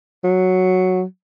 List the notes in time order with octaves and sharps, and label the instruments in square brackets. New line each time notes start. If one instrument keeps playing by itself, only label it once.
[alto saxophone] F#3